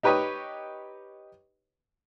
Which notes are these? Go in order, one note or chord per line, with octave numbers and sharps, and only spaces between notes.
D#4 G4 B4 C#5 D#5